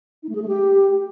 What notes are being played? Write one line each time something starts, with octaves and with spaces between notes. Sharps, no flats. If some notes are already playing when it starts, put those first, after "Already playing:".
D#4
A3
G#4
A3
G4